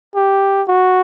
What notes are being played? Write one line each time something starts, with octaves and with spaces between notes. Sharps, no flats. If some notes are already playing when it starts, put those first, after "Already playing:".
G4
F#4